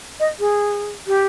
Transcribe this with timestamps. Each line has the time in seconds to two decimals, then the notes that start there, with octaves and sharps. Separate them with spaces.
0.20 D#5
0.39 G#4
1.07 G4